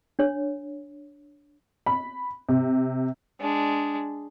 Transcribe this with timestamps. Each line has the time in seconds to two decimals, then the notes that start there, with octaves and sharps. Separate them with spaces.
0.19 D4 C#5
1.86 B5
2.49 C3
3.40 G#3 D4